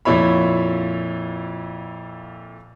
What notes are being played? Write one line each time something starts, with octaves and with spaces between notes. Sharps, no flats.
F2 A#2 E4 C#5 B5